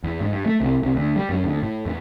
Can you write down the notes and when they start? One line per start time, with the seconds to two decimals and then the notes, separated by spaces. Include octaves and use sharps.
0.04 E2
0.21 G#2
0.32 G2
0.46 A3
0.60 C2
0.82 C2
0.95 D2
1.16 G3
1.29 F#2
1.44 D2
1.63 A2
1.85 E2